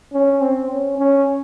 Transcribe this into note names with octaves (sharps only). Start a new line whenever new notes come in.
C#4
C4
C#4
C#4